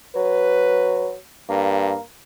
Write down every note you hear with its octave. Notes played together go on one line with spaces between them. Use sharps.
F#3 B4
G2 A#3